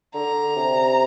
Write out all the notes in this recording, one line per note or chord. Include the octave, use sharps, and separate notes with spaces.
D3 A#5
C3